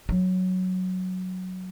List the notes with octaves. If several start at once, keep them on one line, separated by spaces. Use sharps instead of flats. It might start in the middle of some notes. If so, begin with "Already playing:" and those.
F#3